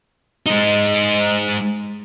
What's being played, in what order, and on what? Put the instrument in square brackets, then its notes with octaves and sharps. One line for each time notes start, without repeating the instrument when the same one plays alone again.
[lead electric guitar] G#3 D#4